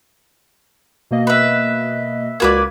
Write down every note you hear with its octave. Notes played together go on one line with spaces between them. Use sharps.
B2 A#3 D#5
B4 E5
C#2 A#3 F#4 B4 D5 G#6